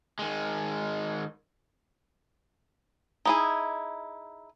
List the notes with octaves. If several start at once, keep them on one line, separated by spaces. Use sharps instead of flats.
D#3 G#3
D#4 E4 G#4